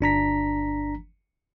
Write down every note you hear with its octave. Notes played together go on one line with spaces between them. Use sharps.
G1 D4 A#5 B6